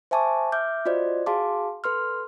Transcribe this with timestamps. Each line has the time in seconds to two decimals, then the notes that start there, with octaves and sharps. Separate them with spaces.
0.11 C5 E5 G#5 A5 C#6 D6
0.52 E5 D6 F6 G6
0.86 F4 F#4 C5 D5 D#5
1.26 F#4 G#4 F5 A5 C6 D6
1.84 A4 B4 C6 F6